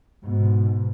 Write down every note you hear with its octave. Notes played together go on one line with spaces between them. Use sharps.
G#2 B2